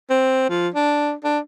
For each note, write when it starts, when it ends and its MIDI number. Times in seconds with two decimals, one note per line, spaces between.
0.10 0.46 60
0.49 0.68 53
0.74 1.13 62
1.24 1.39 62